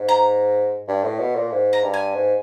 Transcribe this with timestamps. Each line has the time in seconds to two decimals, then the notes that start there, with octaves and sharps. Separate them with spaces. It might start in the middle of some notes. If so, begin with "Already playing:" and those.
Already playing: G#2
0.09 A#5
0.88 G2
1.03 A2
1.19 B2
1.35 A#2
1.51 G#2
1.73 A#5
1.83 G2
1.94 G#5
2.14 G#2